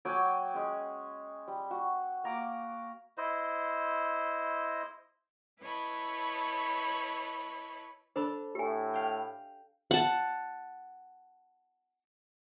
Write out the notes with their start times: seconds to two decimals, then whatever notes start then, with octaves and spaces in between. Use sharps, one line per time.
0.05 F#3 G5 G#5 D6
0.54 G#3 C#4
1.48 G3
1.71 F#4
2.24 A#3 A#5 D6
3.18 E4 C5 D#5
5.61 E4 B4 C#5 D#5 A5 B5
8.16 D4 A4 C5 B5
8.55 A2 G4 G#5
8.94 F5 G5
9.91 F#5 A5